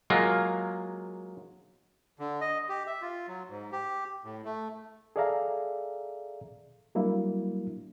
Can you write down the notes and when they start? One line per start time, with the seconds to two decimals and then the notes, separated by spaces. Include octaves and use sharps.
0.10 F#3 G#3 A#3 F4
2.19 D3
2.41 D#5
2.69 G4
2.87 E5
3.02 F4
3.28 F#3
3.49 G#2
3.72 G4
4.24 A2
4.45 A3
5.16 G#4 A4 D5 E5 F5 A#5
6.95 F#3 G3 A#3 D4 E4